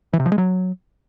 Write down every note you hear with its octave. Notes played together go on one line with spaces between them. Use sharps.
E3
C3
F3
G#3
F#3